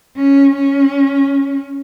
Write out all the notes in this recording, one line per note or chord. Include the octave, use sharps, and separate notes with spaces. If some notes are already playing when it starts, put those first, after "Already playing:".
C#4
C#4